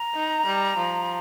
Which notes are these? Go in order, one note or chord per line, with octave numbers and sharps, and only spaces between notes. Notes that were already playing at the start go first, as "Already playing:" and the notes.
Already playing: A#5
D#4
G3
F3